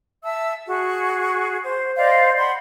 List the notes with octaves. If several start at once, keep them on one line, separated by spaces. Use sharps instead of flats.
E5 A5 E6
F#4 G#4
C5
C5 D5 D#5 F5
F#5 B5 C6